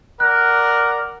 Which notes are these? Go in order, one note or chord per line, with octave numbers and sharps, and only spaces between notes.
A#4 D5 F#5 F#6